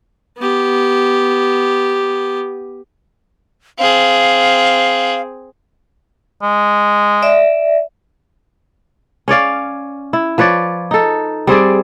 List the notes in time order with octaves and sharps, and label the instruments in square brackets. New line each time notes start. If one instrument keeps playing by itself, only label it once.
[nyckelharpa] B3 G4
[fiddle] C4 G#4 [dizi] F5
[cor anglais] G#3
[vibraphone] D5 E5
[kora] C#4 C#5 D5 F5
E4
F3 B4 C#5 D5
D#4 A4
G3 C4 G#4 D5